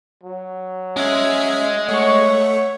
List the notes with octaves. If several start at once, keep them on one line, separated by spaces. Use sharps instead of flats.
F#3
G#3 C#4 G#4 E5
A3 C#5 F#5 C#6